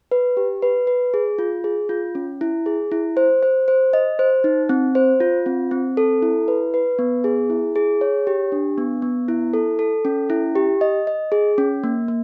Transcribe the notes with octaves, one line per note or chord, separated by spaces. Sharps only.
B4
G4
B4
B4
G#4
F4
G#4
F4
C#4
E4
G#4
E4
C5
C5
C5
D#5
C5
D#4
C4
C5
F4
C4
C4
A4
E4
B4
B4
B3
G#4
E4
G#4
C#5
G4
D4
B3
B3
E4
A4
A4
C#4
E4
G4
D#5
D#5
G#4
C#4
A#3
A#3